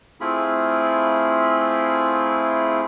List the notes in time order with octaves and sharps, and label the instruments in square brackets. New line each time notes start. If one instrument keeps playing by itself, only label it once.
[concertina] A3 C4 E4 F4 G#4 B5